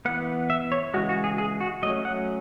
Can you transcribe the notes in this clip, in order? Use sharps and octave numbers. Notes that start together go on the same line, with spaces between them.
E3 B3 F#5
E5
C#5
C#3 E3 G#3 F#4
F#4
G#4
G#4
F#4
F#3 A3 C#4 D#5
F#5